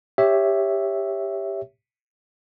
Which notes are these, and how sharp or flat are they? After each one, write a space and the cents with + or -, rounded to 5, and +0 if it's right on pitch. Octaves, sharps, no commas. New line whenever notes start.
G4 +10 C#5 +0 E5 +0